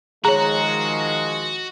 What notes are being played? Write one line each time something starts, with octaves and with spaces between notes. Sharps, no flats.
D#3 F3 G#3 F#4 G#4 C#5 F#5 A#5